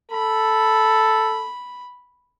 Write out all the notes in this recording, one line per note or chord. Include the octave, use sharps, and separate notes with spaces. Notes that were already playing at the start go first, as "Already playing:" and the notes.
A4 B5